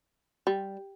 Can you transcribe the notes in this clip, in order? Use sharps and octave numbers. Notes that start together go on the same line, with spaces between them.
G3